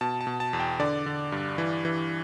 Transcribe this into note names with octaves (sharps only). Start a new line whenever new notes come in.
B2 A5
A5
B2
A5
E2
G5
D3 D5
D3
G2
E3
E3